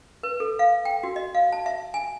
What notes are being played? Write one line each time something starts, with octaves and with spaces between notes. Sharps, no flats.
B4
A4
F5
G5
F#4
D#5
F5
A5
E5
G#5